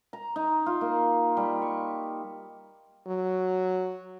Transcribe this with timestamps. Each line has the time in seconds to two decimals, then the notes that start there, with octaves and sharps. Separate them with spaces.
0.13 A#5
0.36 D#4
0.66 F4
0.81 A#3
1.37 G3
1.62 C#6
3.07 F#3